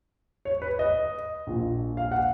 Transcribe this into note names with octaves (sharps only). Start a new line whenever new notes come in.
C#5
B4
D#5
A#1 A#2 F3
F5
F#5